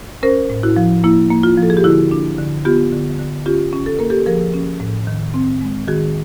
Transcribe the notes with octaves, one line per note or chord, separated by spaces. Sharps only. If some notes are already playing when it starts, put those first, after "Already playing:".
C#4 A#4 C5
A2
E4 F#4
F3
A#3 E4
A#3
F4
F3
A4
G#4
G4
D3 E4 F#4
D4
D3
B3 F4 G4
D3
D3
C#4 F4 G4
C#4
A4
A#3 A#4
G4 A4
F3 G#4 A#4
C#4
A2
D#3
C4
G#3
D#3 F#4 G#4